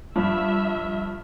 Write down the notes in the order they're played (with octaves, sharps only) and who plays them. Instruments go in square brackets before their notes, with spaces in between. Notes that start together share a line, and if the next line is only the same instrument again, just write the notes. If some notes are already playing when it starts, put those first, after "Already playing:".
[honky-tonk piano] G2 F3 [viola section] E5